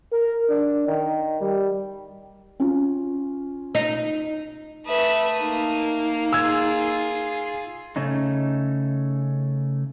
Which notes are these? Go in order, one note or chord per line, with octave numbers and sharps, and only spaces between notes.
A#4
D4
D#3
G3
C#4 F4
D#4
A3 B4 E5 D#6
A#3 D#4
F4 G#4 E6 G#6
C#3 A3 C#4 D#4